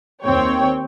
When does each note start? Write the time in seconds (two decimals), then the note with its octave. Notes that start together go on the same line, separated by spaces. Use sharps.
0.24 D#2 C4 C#5 G5